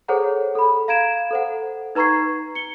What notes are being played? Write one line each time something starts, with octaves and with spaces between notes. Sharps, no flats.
G#4 A4 C5 C#5 F#5 A#5
A4 B5
F5 A#5 G#6 D7 E7
A4 C5 F#5
D#4 B4 A#5 C#6 G#6 C7
C#7 G7